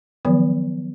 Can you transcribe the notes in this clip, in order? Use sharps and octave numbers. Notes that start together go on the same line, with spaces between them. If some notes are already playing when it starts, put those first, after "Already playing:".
D#3 F3 F#3 B3